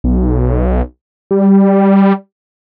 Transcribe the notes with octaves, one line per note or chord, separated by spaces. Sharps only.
B1
G3